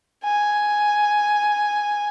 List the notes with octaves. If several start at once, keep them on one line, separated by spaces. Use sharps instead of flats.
G#5